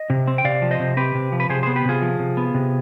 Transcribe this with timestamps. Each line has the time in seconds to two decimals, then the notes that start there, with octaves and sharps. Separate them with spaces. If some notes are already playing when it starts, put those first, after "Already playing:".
Already playing: D#5
0.10 C3
0.27 C4
0.38 G5
0.44 C3 D5 F5
0.62 F3
0.71 C5 D#5
0.80 C3
0.97 C4 G4 B4
1.15 C3
1.32 F3
1.40 B4
1.49 C3 G#4 C5
1.63 B3 G#4 C5
1.76 G4 B4
1.85 C3 F4 G#4
2.02 F3
2.20 C3
2.37 B3
2.54 C3